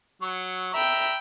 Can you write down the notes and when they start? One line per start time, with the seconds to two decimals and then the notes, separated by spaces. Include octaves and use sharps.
0.22 F#3 C#6
0.74 E5 G5 A#5 B5